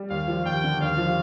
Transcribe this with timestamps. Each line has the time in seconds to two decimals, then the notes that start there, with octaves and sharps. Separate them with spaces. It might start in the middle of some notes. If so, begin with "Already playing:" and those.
Already playing: G3
0.10 D#2 F5
0.28 F3
0.45 D#2 G5
0.64 D3
0.80 D#2 F5
0.98 F3